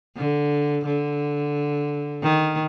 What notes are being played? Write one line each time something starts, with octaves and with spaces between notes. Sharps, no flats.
D3
D3
D#3